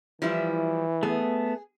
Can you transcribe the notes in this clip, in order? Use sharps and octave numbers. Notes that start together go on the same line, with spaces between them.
E3 F3 G3 E4
A3 B3 G#4